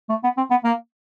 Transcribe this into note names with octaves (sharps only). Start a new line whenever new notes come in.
A3
B3
C4
B3
A#3